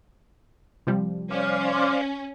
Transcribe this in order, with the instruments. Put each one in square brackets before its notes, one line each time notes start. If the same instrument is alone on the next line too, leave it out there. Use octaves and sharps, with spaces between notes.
[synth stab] C3 F3 G3
[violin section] C#4 [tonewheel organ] C5 D5 F5